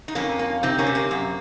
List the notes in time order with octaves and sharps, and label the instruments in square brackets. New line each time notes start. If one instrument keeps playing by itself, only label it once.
[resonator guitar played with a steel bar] D#4
F2 A#3 C#4
A#3
C3 C4 D#4
A#3 C#4
C3
A#3
F#2